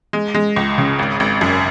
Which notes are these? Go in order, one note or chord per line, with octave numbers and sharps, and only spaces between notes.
G#3
G#3
C#2
C#3
G#1
G#1
F#2